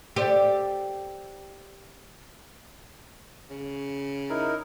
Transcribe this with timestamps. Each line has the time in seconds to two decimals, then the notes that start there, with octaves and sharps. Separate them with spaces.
0.16 G4 A4 C5 D5
3.50 C#3
4.30 D#4 E4 A#4